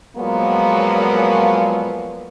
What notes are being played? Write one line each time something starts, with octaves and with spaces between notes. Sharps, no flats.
A#2 F3 F#3 G#3 A#3 B3